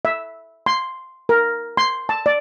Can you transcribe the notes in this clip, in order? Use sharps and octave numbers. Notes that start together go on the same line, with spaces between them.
E5
C6
A#4
C6
A5
D5